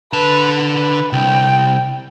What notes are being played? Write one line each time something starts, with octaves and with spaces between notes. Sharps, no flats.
D3 B4 A5
B4
C2 G5